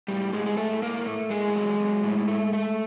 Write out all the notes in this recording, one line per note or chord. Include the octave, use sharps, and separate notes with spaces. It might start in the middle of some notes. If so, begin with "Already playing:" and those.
A2 G3 G4
A2 G#3 G#4
G#4
A2 A3 A4
A2 A#3 A#4
A3
A2 G#3 G#4
F#3
F#3
A2
A3
A3